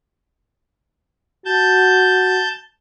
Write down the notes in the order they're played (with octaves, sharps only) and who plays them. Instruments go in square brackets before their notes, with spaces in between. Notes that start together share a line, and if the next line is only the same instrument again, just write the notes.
[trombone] F#4 [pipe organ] A5 G6